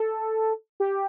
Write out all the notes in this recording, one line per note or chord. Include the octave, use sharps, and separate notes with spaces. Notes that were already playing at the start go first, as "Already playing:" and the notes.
Already playing: A4
G4